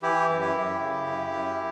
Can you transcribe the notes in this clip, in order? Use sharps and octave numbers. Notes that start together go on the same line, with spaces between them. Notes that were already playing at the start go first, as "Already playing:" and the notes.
E3 E4 G4
F#2
E4 G4
F#2
C#3
F#2
F#2